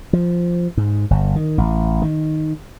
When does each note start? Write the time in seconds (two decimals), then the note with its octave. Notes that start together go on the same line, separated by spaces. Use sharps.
0.13 F3
0.77 G#2
1.11 G1
1.36 D#3
1.58 A1
2.02 D#3